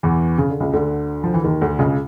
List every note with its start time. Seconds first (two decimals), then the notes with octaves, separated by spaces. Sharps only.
0.03 E2 E3
0.38 C#3
0.50 D3
0.60 C#2 C#3
0.73 D2 D3
1.24 F3
1.34 E3
1.44 D#2 D#3
1.61 D2 D3
1.79 C#2 C#3